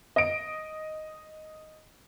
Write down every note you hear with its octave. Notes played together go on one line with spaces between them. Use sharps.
D#5 D7